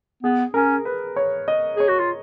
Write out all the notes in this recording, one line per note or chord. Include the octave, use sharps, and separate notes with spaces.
B3 G#4
C#4 A#4
B4
C#5
D#5
G#4 C#5
F#4
F4